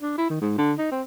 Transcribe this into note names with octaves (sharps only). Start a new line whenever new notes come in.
D4
E4
D#3
G#2
D3
D#4
C4